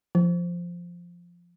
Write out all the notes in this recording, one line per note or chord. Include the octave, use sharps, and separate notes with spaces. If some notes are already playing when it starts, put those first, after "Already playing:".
F3